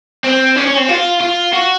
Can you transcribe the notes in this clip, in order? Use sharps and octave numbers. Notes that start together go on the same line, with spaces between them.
C4
C#4
C#4
C4
F4
F4
F#4